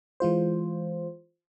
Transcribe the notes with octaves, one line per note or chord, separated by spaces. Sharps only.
E3 G#3 F4 C5